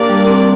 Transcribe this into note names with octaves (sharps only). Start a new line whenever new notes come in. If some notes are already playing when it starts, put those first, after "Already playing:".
Already playing: A#3 D4 G4 A#4 D5
G3
C4